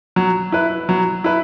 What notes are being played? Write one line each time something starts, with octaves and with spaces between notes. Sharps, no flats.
F#3
E4 B4
F#3
E4 B4